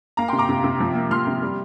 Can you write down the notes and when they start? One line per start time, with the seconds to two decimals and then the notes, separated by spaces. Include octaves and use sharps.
0.17 A#3 F5 A#5
0.28 G5 C6
0.33 C3
0.38 A#5 D6
0.49 C3
0.64 C3
0.80 F3
0.95 A#3
1.10 F3 C6 F6
1.27 C3
1.42 G3